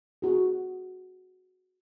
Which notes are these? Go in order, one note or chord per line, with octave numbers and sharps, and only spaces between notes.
F#4 G#4